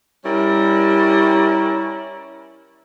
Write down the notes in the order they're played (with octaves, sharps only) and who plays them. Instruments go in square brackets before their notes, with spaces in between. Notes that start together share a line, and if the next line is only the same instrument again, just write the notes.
[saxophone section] G3 C#4 E4 A#4